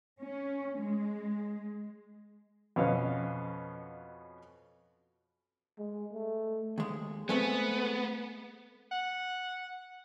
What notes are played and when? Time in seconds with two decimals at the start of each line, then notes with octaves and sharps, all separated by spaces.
0.21 C#4
0.78 G#3
2.76 F2 B2 C#4 C#5 F5
5.79 G#3
6.13 A3
6.78 D#2 G#3
7.29 G#3 A3 B3 C4
8.91 F#5